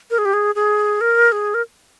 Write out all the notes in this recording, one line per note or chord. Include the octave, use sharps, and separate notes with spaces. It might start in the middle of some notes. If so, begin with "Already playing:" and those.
A#4
G#4
G4
G#4
G#4
A#4
G#4
A#4